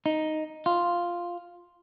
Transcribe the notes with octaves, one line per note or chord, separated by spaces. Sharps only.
D#4
F4